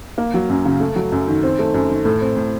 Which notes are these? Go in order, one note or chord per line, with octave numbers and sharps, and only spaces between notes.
A#3
F#3
F#2
C#3
A3
F#3
F#2
D#3
C4
A3
F#2
D#3
A2
C4
A2